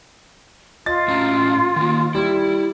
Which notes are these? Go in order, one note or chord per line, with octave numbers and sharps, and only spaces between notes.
F4 D#5 A6
A2 C#4 A#5
D#3 A#3
G3 E4